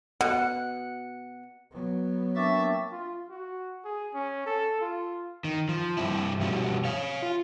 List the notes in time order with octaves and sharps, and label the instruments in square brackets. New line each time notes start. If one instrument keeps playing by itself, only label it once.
[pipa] B2 [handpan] F#5
[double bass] F#3 B3
[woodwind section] A#3 C4 D4 [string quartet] E5 [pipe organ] C#6 D6 A6
[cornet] F4
F#4
G#4
C#4
A4
F4
[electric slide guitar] D#3
F3
G2 C4 E4
B2 F3 G3 C#4 F#4
C#5 F5
F4